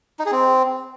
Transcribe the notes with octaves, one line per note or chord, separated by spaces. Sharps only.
D#4
G#4
C4